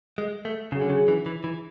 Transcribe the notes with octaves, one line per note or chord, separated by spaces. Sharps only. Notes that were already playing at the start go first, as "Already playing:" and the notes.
G#3
A3
C#3 F#3 C#4 G#4
D3
C#3
E3
E3
E3